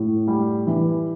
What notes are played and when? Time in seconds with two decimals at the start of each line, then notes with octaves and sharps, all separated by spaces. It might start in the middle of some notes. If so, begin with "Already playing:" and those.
Already playing: A2
0.27 G3
0.67 E3